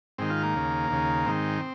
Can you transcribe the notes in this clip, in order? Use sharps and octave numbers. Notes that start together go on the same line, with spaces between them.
G#2 D#3 C4
F4
A#3
D#2 C#3
D#2 C#3
G#2 D#3 C4